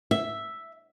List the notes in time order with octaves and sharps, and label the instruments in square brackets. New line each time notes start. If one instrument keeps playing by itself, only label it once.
[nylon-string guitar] E5